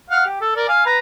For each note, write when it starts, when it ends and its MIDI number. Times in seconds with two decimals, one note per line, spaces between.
0.10 0.24 77
0.10 0.24 78
0.26 0.39 67
0.41 0.56 69
0.56 0.67 70
0.56 0.67 74
0.68 0.85 77
0.68 0.85 80
0.86 0.98 71
0.86 0.98 82